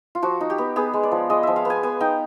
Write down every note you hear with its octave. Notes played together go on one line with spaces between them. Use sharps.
F4
F3 F#4
D#4
G4
B3
B3 G#4
G#3
D5
F3
G#3 D#5
F3 E5
F5
B3
G#5
B3 G#5
D#4 G5